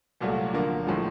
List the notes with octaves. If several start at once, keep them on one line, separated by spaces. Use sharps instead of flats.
C2 A#2 F#3 A3
D3 F3 A#3
A2 F3 G#3